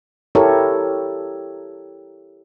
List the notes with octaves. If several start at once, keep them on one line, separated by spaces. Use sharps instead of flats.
E4 G4 A4 A#4 C#5